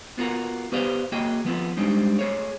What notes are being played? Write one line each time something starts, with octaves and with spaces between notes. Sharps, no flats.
B3 F4 F#4 A#4
B3 G4 B4 C5 D5 F5
A#3 F#4 G#4 D#5 G5
F3 B3 C4 F4
G3 G#3 C4 D4 D#4
A3 G#4 C#5